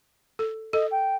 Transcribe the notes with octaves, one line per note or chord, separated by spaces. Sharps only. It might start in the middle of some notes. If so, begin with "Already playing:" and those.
A4
A4 D#5
G5